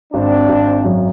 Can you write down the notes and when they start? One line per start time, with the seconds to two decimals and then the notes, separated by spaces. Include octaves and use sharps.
0.13 G#1 C4 D4
0.49 G#1
0.85 F#2